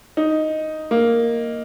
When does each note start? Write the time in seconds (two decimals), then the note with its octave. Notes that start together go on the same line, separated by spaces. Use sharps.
0.17 D#4
0.91 A#3